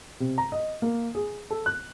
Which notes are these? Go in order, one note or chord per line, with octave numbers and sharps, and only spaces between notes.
C3
A#5
D#5
A#3
G#4
A4
F#6